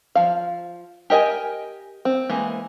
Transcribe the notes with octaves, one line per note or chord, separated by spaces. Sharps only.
F3 F5
G4 A#4 D#5 G5 G#5
C4
E3 G#3 A#3